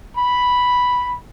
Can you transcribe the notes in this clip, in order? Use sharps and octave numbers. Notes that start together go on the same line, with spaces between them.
B5